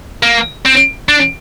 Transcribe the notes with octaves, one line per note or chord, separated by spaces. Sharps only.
A#3
C4
D4